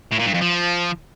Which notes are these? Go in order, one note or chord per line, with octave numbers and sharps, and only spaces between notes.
A2
A#2
G2
F2
F3